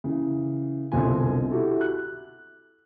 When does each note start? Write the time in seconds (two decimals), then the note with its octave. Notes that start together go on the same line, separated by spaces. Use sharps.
0.04 C#3 E3
0.92 C2 B2 D3 C4 F4 G#5
1.50 E4 F#4 G4 A4
1.81 F#6